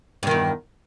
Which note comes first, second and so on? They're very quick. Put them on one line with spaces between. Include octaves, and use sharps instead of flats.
G2 D#3 E2